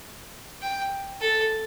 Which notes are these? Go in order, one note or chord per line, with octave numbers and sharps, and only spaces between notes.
G5
A4